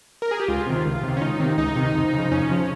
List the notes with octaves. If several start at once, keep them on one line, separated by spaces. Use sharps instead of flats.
A#4
G#4
G4
C#2 F4
C3 D#3
C#2
C3 D#3
C#4
C#2 D#4
C3 D#3
C#2 D#4
C3 D#3
F2
C#3 F3
F2 C#4
C#3 F3